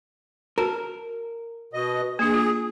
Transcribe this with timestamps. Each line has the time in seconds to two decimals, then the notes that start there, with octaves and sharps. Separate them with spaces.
0.58 F#4 A#4 A5 A#5
1.73 B2 D#5
2.19 A#3 D4 G#4
2.34 F4